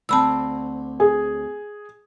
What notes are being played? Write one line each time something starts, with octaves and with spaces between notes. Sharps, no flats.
D2 C4 A5 B5 E6
G#4 G#5